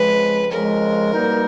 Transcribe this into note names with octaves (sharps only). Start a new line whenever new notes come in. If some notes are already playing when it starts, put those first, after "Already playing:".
Already playing: F2 C#3 F3 G#3 B4
F2 C#3 F3 G#3 A#4
C2 B2 G3 A#3 D#4